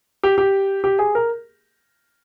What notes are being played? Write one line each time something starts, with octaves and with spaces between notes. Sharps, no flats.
G4
G4
G4
G#4
A#4